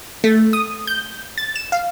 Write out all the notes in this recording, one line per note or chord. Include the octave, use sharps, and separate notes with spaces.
A3
D#6
G6
A6
E7
F5